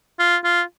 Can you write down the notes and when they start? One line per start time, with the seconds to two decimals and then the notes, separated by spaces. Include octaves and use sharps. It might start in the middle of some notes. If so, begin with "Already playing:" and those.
0.19 F4
0.44 F4